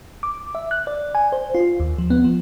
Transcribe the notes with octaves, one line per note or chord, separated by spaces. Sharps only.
D6
E5
F#6
D5
G#5
C5
F4
D#2
F3
B3
F3